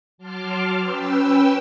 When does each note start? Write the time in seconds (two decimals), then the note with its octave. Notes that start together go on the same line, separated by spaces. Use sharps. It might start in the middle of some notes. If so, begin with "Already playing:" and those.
0.18 F#3 A5 C6 D6 F6
0.78 C#4 B4 G5 E6